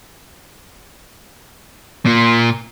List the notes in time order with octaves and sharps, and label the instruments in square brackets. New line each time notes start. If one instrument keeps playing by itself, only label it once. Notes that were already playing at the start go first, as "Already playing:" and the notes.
[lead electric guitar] A#2 A#3